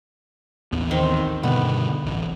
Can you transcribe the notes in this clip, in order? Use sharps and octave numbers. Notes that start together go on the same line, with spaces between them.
A1 D#2 B3
D#3 C4
G2 B2 D3 B3
D1 A1